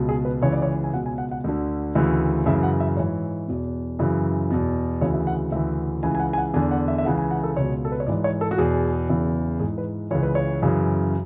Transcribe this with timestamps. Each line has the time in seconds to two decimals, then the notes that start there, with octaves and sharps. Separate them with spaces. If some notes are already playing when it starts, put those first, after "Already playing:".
Already playing: C#2 B2
0.09 G#4
0.25 B4
0.42 C#2 C#3 E3 C#5
0.52 D5
0.62 C#5
0.84 G#5
0.93 C#2 B2 F#5
1.06 G#5
1.18 F#5
1.31 F#5
1.44 D2 D3
1.95 D2 C#3 E3
2.46 F#2 C#3 E3 E5
2.63 F#5
2.80 E5
2.97 G#2 E3 C#5
3.48 E2 B2
3.99 F#2 C#3 E3
4.51 E2 B2
5.01 D2 C#3 E3 C#5
5.14 E5
5.27 F#5
5.52 D2 C#3 E3 E5
6.03 C#2 C#3 E3 G#5
6.15 G#5
6.20 F#5
6.33 G#5
6.38 F#5
6.54 E2 D3 G#5
6.71 F#5
6.88 E5
6.98 E5
7.05 C#2 C#3 E3 F#5
7.18 G#5
7.31 F#5
7.43 A4
7.56 C#2 B2 C#5
7.85 A4
7.92 B4
8.00 C#5
8.07 G#2 E3 D5
8.24 C#5
8.41 A4
8.51 F#4
8.58 E2 B2 G#4
9.09 E2 C#3 E3
9.60 G#2 E3 G#4
9.78 B4
10.11 C#2 C#3 E3 C#5
10.23 B4
10.35 C#5
10.62 F#2 C#3 E3